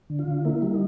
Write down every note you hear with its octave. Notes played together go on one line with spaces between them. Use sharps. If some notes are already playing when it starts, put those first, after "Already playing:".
D3
F4
D3
A#3 E4
G3
D#4